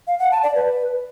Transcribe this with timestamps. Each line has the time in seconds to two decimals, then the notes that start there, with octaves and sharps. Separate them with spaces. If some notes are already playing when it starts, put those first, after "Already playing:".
0.07 F5
0.19 F#5
0.31 A5
0.43 D5
0.55 B4